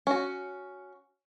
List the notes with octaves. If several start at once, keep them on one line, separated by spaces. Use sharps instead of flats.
C#4 F#4